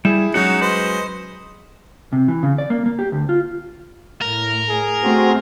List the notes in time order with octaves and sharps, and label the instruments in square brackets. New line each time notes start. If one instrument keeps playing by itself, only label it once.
[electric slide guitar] G3 [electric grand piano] E4 G#4 [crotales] E7
[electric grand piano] F#3 G#3 C#4 [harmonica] D#4 [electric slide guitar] F#4 [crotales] C#7
[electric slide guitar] B4 [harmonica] C5 D#5
[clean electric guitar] C3
E3
C#3
D5
A#3
A#3
G4
D2
F4
[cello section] A2 [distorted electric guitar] A#4
[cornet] G#4
[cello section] A3 C4 [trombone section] F#4